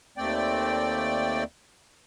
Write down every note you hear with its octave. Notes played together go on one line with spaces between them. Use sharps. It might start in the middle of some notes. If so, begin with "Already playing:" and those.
D#2 A3 C4 D5 G5